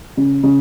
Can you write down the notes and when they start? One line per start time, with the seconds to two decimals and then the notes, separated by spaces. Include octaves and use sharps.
0.17 C#3
0.43 C#3